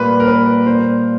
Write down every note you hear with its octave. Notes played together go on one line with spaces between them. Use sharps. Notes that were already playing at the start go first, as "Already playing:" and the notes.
Already playing: A#2 G3 A#3 B4
A#4
B4
A#2 G3 A#3 C5